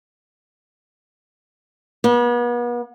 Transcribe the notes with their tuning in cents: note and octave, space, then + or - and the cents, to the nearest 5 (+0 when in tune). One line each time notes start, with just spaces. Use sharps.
B3 -40